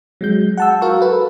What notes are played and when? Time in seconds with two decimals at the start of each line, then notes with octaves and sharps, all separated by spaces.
0.21 F#3 G#3 G6
0.57 F#5 A5 E6
0.81 F#4 A#4 F5 C#6
1.00 A4 B4